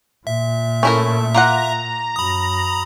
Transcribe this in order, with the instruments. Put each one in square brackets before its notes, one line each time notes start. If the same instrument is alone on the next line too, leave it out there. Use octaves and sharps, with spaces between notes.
[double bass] A#2 [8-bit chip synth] E5
[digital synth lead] A3 [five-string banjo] C#4 E4 A#4
[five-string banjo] A#3 F4 F#5 [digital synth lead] A#5
[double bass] F#2 [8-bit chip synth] B5 D#6